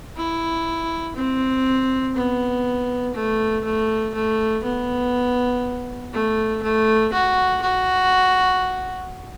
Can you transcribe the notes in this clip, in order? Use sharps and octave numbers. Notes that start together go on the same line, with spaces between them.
E4
C4
B3
A3
A3
A3
B3
A3
A3
F#4
F#4